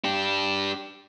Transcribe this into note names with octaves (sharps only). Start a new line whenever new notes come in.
D4 G4